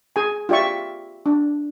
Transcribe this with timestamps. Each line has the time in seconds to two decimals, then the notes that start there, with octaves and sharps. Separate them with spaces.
0.16 G#4 G#5
0.49 F4 G4 D5 E5 C#6
1.26 D4